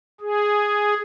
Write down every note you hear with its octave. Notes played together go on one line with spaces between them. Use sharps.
G#4